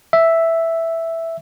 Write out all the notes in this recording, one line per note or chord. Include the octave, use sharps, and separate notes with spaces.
E5